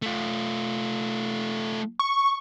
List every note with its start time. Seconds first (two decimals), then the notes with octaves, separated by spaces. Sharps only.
0.02 A3 F4
1.99 C#6